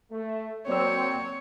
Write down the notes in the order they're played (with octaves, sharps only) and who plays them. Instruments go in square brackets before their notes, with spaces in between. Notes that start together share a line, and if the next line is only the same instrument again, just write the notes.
[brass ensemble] A3
[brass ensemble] F#3 [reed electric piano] A#3 D5 E6 [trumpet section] C4 [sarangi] C#5